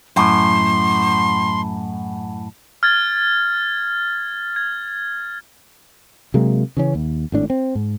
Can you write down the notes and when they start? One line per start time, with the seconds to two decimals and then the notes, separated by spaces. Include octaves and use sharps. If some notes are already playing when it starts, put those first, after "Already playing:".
0.16 F#2 A2 C6
2.83 F6 G#6 A6
4.56 G#6
6.34 C3 F#3 G#3 A#3
6.77 C#3 E3 C#4
6.95 D#2
7.32 G#1 A2 D4
7.50 C4
7.75 G#2